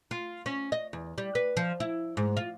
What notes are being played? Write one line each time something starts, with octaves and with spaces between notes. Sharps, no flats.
F4
C#4
D#5
E2
G3
B4
F3
E4
G#2
F4